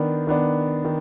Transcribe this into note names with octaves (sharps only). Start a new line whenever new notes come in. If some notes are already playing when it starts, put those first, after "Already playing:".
Already playing: D#3 B3 D4
D#3 B3 D4
D#3